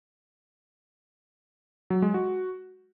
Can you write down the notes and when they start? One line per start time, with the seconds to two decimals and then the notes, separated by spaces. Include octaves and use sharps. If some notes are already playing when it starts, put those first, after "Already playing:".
1.90 F#3
2.02 G#3
2.14 F#4